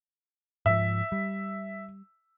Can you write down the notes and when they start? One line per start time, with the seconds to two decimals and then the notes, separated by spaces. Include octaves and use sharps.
0.66 G#2 F3 E5
1.12 G3